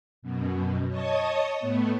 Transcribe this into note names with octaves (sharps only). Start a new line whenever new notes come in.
F#2 B2
C#5 D#5 A5 C#6 D#6
A2 A3 B3